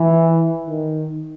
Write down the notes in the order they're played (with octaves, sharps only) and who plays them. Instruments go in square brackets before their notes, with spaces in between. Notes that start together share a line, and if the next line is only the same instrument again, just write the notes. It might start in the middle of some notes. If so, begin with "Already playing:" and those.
Already playing: [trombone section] E3
D#3